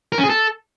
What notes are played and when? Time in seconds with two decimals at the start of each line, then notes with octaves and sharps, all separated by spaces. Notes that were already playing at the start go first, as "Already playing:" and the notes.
0.12 A#4
0.18 C#4
0.24 G#4
0.29 A4